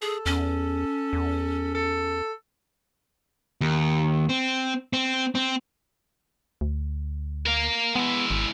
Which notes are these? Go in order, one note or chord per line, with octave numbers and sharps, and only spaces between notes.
G#4 A4
E2 C#4
E2
A4
D#2
C4
C4
C4
D2
A#4 F5
G#3 B3 E4
G#1